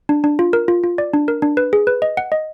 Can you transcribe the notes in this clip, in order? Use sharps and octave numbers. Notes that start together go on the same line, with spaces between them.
D4
D4
F4
A#4
F4
F4
D5
D4
A#4
D4
B4
G#4
B4
D#5
F#5
D#5